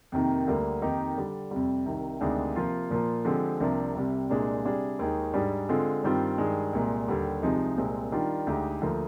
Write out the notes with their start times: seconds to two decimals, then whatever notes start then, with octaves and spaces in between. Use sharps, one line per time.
0.12 F2 C3 D#3 A#3
0.47 D2 D3 G3 A#3
0.82 F2 D#3 A#3 D#4 G4
1.17 D3 G3 D4
1.51 F2 C3 G3
1.86 C2 C3 D#3
2.21 D2 C3 D#3 G#3 D4
2.56 C3 F3 A#3 F4
2.90 A#2 F3 A#3 F4
3.25 D3 F3 G#3 C4 G4
3.60 C2 C3 F3 A#3 D4
3.95 C2 C3 G3
4.29 C2 A#2 G#3 D4 G#4
4.64 C3 G3 D4 G#4
4.99 D#2 D#3 G#3
5.34 G#2 G3 D4 G#4
5.69 D3 G#3 C4 F4
6.03 G2 D#3 G3 C4 F4
6.38 G2 D#3 G#3
6.73 C2 A#2 G#3
7.08 D#2 D3 G3
7.42 C2 C3 F3 G#3 D#4
7.77 C2 A#2 G#3 C4
8.12 D#3 G3 D4 F4
8.47 D2 D3 G#3 D#4 G4
8.81 D2 D3 F3 A#3